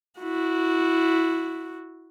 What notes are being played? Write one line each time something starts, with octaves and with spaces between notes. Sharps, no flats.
E4 F#4